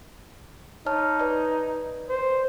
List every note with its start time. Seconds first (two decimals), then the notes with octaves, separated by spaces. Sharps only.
0.86 D#4 C#5 A5 F6
1.20 B4 D5
2.09 C5